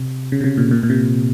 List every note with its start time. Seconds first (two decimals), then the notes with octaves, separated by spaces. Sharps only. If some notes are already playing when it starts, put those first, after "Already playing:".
Already playing: C3
0.32 C#3
0.41 C3
0.44 C#3
0.57 A#2
0.71 A#2
0.83 A#2
0.90 C3